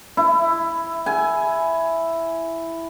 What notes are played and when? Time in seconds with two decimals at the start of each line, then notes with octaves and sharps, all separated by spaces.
0.17 E4
1.06 G#5